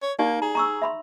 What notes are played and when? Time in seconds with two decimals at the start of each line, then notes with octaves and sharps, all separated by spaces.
0.03 C#5
0.19 A#3 D#4 G4 D5
0.42 G#4 A#5
0.55 A#5 C#6 E6
0.82 E5 B5 C6